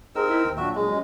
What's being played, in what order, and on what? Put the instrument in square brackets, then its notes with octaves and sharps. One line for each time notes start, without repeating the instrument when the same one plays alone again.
[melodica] C4 A#4 E6 [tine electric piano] D#4 G4 [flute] G#4
[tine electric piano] D#4 E5 [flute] E4
[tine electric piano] D#2 [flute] G5
[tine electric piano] A#2 F#3 D4 [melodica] F#4 E5
[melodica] G#3 [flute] G#4
[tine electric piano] F#3 G3 C#4 [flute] D#5